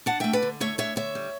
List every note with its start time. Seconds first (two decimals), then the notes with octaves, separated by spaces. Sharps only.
0.06 D4 F#5 A5
0.20 A3 E5 G5
0.33 B4 D5
0.42 D3
0.60 A3 C#5 E5
0.78 D3 C#5 E5
0.96 D3 C#5 E5
1.15 G3